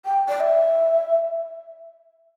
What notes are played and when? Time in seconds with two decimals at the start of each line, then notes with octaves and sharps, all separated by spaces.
0.05 G5
0.29 D5
0.40 E5